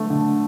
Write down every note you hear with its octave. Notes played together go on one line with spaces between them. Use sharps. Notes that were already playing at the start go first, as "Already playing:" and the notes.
Already playing: D3 A3
D3